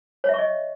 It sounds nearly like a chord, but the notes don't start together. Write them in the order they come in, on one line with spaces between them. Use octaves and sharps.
C#5 E5 C#6 D#5